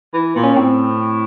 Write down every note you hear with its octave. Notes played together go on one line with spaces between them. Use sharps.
E3
A#2
C#4
A2 C4